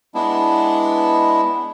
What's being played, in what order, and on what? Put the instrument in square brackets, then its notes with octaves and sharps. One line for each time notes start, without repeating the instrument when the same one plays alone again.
[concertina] G#3 B3 D4 E4